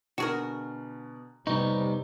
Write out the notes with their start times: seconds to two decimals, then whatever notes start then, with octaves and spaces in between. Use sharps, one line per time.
0.18 B2 D3 F#4 G#4 A#4
1.47 F1 C3 G3 B3 D#4 C#6